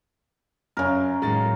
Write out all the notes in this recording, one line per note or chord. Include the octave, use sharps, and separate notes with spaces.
F#2 C#3 A#4
A2 D#3 F#3 G#3 A6